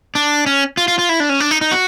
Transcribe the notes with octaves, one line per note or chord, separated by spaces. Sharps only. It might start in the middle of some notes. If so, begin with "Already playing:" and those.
D4
C#4
F4
F4
F4
E4
D4
C#4
D4
D#4
D#4
F#4